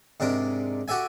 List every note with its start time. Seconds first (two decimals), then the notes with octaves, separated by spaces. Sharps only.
0.20 G#2 C3 D4 A#4
0.88 F#4 G4 A4 E5 G#5